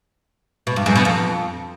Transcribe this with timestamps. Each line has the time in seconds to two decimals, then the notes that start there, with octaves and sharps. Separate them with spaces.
0.67 B2
0.76 G2
0.86 F#2
0.96 B2
1.05 F2